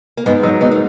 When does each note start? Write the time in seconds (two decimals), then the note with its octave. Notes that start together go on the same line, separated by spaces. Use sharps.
0.17 A#3
0.26 G#2 G#3 B3
0.43 F#3 D#4 F#4
0.61 G#2 B3 D#4
0.71 A#3